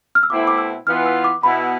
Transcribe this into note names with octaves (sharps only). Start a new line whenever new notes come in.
F6
E6
B2 A3 C4 E4 D6
D6
E6
E3 B3 F4 F6
E6
D6
B2 B3 E4 B5